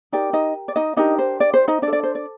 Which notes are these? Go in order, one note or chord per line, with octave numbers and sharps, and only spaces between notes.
D#4 G4 A#4 D5
D#4 D#5
D5
D#4 D#5
D4 D#4 G4 A#4 D#5
C5
D5
C5
D#4 D#5
D4 D5
A4
D5
C5
D5